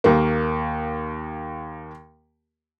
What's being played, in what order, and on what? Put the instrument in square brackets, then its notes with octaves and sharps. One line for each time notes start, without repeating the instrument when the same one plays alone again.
[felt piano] D#2 A#3